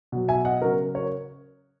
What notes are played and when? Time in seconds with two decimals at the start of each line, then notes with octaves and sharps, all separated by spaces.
0.12 B2 F#3
0.28 E5 G#5
0.45 D#5 F#5
0.61 C#3 F#3 F#4 A#4
0.95 A#4 C#5